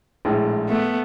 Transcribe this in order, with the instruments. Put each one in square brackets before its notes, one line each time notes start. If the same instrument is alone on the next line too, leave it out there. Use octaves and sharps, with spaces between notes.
[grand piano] A#1 A2 G#3
[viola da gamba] A3 B3